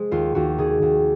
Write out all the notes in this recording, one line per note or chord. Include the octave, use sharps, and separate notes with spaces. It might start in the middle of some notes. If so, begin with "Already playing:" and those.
Already playing: G#3 C5
D#2 F4
D#2 F#4
D#3 G#4
D#2